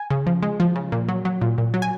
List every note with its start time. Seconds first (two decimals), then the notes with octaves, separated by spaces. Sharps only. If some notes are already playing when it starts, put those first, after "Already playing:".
Already playing: G#5
0.10 C#3
0.27 F3
0.42 G#3
0.60 F3
0.76 C#3
0.92 A#2
1.09 F#3
1.25 F#3
1.42 A#2
1.58 A#2
1.74 F#3
1.82 G#5